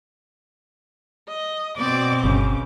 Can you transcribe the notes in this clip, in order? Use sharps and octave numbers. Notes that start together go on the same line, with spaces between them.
D#5
B2 C4 D5 D6
G1 C#3